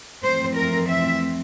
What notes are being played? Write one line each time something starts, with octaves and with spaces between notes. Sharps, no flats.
F2 E3 A3 C4 C5
A#4
E5